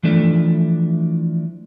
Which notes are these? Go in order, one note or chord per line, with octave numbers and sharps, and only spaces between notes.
E3 F3 A3 D4